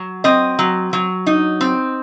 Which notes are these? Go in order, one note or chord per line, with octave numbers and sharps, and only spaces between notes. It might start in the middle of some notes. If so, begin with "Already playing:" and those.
Already playing: F#3
C4 D#5
F#3
F#3
D#4
C4